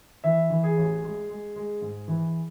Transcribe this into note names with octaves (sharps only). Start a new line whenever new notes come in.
E3 E5
E3
G#4
A1
G#3
G#3
G#3
G#2
E3